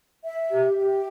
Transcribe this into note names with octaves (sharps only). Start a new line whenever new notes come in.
E5
G4
G4